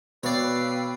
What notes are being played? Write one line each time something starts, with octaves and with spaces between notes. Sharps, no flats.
B2 B4 C#5 D5 F5 G5 E6